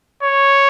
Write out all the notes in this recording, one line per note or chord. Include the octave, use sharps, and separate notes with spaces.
C#5